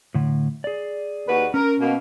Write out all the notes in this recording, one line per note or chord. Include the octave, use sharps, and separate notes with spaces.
A2 D3
G#4 D5
D#2 F#4 B4
C#4 A#4
B2 A#3